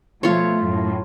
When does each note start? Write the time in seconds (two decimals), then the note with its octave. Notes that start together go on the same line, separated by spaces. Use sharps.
0.23 B2 F3 A3 F4 C#5
0.63 F#2 A2